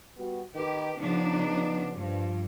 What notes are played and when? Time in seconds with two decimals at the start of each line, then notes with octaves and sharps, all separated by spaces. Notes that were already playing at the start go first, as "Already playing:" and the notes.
0.17 G3 B3 F#4
0.54 D#3 G4 B4
0.99 C#3 F3 B3 D4 D#4
1.97 G2 F3